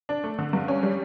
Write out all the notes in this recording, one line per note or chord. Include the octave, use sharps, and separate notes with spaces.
D4
A3
D3
G2
C#4
G3